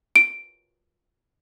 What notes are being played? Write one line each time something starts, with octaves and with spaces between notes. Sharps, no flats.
D7